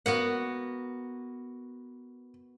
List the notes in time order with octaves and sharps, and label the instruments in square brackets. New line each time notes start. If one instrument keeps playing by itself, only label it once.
[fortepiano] A#3 [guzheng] B3 F#4 F#5